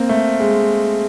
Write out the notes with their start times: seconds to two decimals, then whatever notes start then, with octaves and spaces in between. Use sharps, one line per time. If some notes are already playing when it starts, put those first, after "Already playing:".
Already playing: A#3 C4
0.09 A3
0.40 G#3